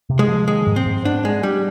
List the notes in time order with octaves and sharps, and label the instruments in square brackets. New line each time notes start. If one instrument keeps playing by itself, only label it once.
[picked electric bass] C3
[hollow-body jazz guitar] G#3
[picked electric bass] F3
[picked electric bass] D#3 [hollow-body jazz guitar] G#3
[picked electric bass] G#2
[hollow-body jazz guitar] C4
[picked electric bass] G#2
[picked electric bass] B3 [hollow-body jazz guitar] D4
[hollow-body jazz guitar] G#3 [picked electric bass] D4
[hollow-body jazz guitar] G3 [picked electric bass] D4